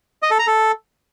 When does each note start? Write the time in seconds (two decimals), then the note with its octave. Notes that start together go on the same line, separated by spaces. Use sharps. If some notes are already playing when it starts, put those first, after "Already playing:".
0.23 D#5
0.31 A4
0.39 A#5
0.47 A4